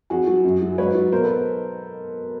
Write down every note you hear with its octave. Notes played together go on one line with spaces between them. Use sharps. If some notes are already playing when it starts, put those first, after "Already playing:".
F2 F#4 G#4
F#3
F#2
F#3
G#2 B4 C#5
F#3
B2 A#4 C5
A4 B4